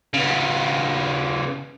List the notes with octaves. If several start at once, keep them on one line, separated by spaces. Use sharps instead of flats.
C#3 B3